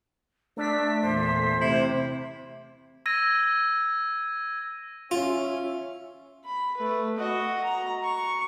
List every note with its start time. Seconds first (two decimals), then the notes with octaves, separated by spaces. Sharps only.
0.57 A3 D4 B6
1.02 E2 A#2 C5
1.61 C3 E4
3.06 E6 G#6 A#6 D#7
5.11 C#4 F4 E5
6.45 B5
6.77 A3 B4
7.17 F#4 D#5
7.64 A#5
8.04 C#6